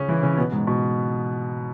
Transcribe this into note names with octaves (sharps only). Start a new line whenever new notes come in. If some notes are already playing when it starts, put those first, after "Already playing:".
Already playing: C#3 C#4
E3 E4
C#3 C#4
B2 B3
G#2
B2